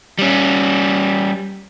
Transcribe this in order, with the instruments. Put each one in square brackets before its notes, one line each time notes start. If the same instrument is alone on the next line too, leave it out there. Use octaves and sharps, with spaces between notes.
[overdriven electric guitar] G3 C#4